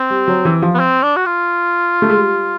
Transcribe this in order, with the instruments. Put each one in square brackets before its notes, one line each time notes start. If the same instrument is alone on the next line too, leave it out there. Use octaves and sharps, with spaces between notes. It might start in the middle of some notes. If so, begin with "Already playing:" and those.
Already playing: [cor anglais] C4
[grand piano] G3
F#3
E3
F3
[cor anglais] B3
C4
D4
F#4
F4
[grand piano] A3
G#3
G3